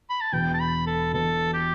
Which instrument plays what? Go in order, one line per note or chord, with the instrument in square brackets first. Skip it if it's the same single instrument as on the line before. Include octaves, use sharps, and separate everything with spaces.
[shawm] B5
A5
[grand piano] E1 E2 B2 [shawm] G5
[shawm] A5
B5
A4
[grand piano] E1 E2 B2 [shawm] A4
[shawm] G4